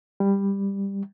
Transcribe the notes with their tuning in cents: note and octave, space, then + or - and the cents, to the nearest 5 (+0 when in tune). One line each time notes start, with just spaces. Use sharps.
G3 +15